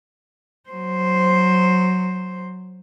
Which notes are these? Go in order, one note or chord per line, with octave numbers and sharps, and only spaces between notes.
F#3 C5